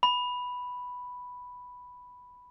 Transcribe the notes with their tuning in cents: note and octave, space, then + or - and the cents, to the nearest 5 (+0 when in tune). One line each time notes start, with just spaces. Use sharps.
B5 +0